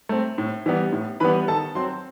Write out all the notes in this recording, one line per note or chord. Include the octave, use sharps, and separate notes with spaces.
A3 C4
A2
E3 G3 B3
A2
E3 G3 B3 B4 B5
D#3 A4 A5
F#3 C4 C5 C6